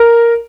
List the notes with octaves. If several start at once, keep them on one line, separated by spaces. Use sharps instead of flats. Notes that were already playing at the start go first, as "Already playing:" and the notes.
Already playing: A#4